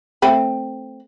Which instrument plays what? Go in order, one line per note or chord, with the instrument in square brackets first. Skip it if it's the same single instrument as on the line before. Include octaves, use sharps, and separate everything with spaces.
[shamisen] A3 C4 B5